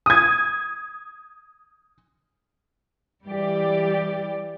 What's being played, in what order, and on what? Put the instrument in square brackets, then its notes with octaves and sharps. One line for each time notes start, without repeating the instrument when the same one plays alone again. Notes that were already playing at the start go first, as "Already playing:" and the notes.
[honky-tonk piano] D#6 G#6
[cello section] E3 G3 G4 D5